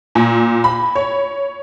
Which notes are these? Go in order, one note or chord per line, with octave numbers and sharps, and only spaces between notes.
A#2
B5
C#5